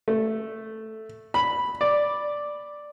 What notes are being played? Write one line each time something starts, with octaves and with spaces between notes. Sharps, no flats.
A3
B5
D5